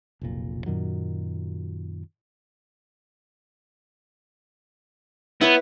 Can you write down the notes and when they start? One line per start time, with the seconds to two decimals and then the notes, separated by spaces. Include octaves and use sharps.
0.21 F1 B1 A#2
0.66 F#2 A#2 D#3 F#3
5.41 B3 E4 B4 C#5